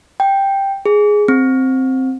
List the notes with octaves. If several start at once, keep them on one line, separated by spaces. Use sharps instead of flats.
G5
G#4
C4